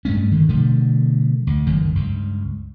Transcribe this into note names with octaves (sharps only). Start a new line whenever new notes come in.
G2 G#3 A3 C#4
D3 D#3
B2 D3 F3 A3
D2
G1 C#2 F#2 D#3
C#2 G2